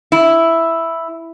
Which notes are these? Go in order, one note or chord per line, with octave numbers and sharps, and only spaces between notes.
E4